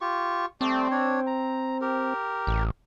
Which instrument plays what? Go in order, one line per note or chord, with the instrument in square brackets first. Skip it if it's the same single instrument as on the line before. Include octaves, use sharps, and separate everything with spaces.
[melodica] F4 G4 C#6
[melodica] G3 A3 D5 [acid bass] C4
[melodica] D4 C#5
A#5
G4 A#4
[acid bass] A1